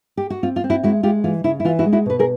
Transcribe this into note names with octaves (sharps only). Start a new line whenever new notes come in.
G4
F#4
C4 F4
F4
C4
E4 F#4
G#3 E4 F#4
G#3 F4 G4
E3 F4
C#3 E4
E4
E3 F4
E4 F#4
G#3
E4 F#4
B2 B4
G#4 A#4